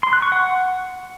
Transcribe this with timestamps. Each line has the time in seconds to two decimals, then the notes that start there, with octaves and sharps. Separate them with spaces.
0.03 C6
0.13 F#6
0.22 C#6
0.32 F#5